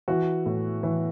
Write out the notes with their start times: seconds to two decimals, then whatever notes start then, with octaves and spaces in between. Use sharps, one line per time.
0.08 E3 F#4
0.46 A2
0.83 E3